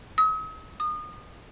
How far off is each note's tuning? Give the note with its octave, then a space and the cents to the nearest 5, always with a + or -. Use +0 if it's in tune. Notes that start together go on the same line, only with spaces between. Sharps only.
D#6 +45
D#6 -30